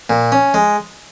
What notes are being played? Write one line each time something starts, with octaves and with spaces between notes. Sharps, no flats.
A#2
C#4
G#3